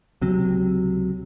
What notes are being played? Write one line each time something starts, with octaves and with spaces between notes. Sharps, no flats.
C#2 C3 F#3